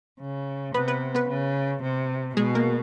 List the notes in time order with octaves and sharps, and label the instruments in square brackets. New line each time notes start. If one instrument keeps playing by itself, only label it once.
[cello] C#3
[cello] C3 [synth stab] B3 B4
[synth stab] B3 B4
B3 B4
[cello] C#3
C3
[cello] B2 [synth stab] G#3 G#4
[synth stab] A#3 A#4